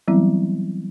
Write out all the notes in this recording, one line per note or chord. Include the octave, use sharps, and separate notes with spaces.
E3 F#3 G3 B3 C4 E4